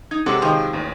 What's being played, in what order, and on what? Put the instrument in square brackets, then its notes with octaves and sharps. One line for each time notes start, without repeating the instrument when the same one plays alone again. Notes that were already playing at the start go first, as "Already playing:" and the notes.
[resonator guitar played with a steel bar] D#4 [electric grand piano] G#6
[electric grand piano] C3 F#3 G#3 [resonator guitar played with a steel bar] C4 A4 F#5 [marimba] D6
[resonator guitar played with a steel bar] D#3 [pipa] F3 [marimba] D#5 G5
[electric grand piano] A1 D#2